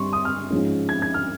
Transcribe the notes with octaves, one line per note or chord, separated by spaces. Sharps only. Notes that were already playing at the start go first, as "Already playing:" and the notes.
Already playing: G2 G3 C4 C6 C#6
D#6
F6
G#2 F3 G#3 C#4
G#6
G#6
F6